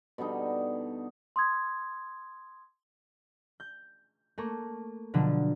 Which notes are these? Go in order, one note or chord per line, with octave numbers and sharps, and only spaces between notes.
B2 D3 G3 D#4
C6 D#6 G#6
G6
A3 A#3 C#6
B2 D3 F3 F#3